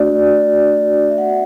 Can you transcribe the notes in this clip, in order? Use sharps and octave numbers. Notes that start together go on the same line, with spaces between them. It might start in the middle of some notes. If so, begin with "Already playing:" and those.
Already playing: A3 D4 F#4 D5
E5
B3 F#4 F#5